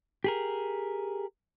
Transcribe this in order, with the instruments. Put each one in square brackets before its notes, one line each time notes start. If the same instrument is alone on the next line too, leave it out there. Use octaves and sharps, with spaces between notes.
[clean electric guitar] G4 G#4 A#4